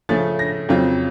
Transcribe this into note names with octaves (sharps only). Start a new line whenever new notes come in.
C#3 F3 A3 C#4 A6
A#6
F2 C#3 F#3 C4 F4